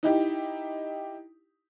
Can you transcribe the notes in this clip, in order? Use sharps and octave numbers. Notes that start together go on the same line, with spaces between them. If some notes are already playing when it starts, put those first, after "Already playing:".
D#4 E4 G4